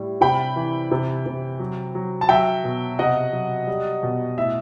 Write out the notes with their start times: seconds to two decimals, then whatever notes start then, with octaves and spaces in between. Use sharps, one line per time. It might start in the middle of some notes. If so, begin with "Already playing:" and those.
Already playing: A2 G3
0.21 C3 G5 B5
0.56 E3
0.91 C3
1.26 C3
1.59 F#3
1.95 F#3
2.21 A5
2.29 F#3 E5 G5
2.64 B2
2.99 C3 D#5 F#5
3.33 F#3
3.67 G3
4.03 B2
4.38 A2 E5